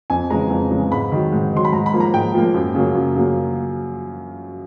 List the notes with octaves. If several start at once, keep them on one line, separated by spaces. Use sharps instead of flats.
F2 G#5
C#3 E3 G#3 A#5
F2
C#3 E3 G#3
G#2 B5
D#3 F#3
G#2
D#3 F#3 C6
B5
G#2 A#5
B5
F3 A#3
A#5
G#2 G5
F3 A#3
F#2
C#3 F#3 A#3
F#2
C#3 F#3 A#3